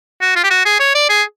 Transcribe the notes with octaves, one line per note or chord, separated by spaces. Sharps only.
F#4
F4
G4
F#4
G#4
C#5
D5
G#4